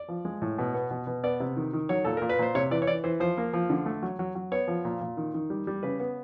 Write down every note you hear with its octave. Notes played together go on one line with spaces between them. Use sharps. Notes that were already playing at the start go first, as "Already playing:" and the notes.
Already playing: D5
F3
G#3
A2
B2
B3
B2
B2
B3 D5
C3
D#3
D#3
F#3 C#5
A#2 A4
A#2 A#4
B4
A#2 C5
C3 C#5
E3 D5
C#5
E3 D5
E3 C5
F3 C5
A#3
F3
D3
A3
F#3
F#3
F#3
B3 C#5
F3
A#2
A#2
D#3
D#3
G3
G3
C#3 B4
B3